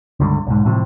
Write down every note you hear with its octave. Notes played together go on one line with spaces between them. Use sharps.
C#2 G2 D3
B1 G#2
A2 C3 E3 F3